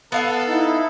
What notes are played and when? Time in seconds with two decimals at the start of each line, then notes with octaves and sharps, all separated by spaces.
0.12 B3 A4 F5 F#5
0.48 D#4 E4